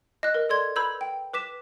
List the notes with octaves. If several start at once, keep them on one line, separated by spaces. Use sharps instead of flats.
D#5 F#6
A#4 B4
A4 D5 C6 G#6
B4 A#5 B5 E6 G6 G#6
G5
B4 D6 B6 E7